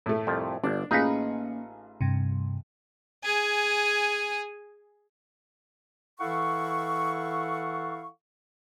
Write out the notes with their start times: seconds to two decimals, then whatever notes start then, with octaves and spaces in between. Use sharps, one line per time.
0.06 A2 A3
0.27 C2 F2 F3
0.64 G1 D4 D6
0.91 A1 A#3 C#4 D#4 F4 G#4 B4
2.01 G2 C3
3.24 G#4 G#5
6.20 E3 E4 A4 F5 F#5 C#6